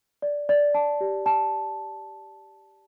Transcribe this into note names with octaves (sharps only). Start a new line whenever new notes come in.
D5
D5
A5
G4
A5